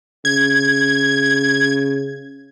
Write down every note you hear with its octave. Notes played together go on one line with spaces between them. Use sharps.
C#3 G#6